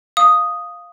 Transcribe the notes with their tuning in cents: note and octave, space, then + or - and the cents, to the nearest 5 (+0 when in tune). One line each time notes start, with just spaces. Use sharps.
F5 +0 D#6 +0